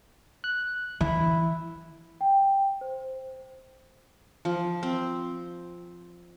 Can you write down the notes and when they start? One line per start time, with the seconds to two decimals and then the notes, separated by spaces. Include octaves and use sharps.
0.44 F#6
1.01 E3 E4
2.21 G5
2.81 C5
4.45 F3
4.83 C4